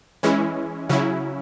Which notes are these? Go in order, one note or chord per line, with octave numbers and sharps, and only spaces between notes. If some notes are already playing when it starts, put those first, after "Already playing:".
E3 G#3 C#4 E4
C#3 F#3 C#4 E4